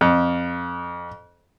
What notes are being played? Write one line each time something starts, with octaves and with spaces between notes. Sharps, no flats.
F2